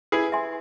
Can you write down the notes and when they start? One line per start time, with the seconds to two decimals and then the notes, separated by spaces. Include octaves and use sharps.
0.12 E4 G#4 B4
0.32 E5 G#5 C6